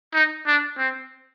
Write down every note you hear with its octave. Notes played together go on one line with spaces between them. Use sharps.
D#4
D4
C4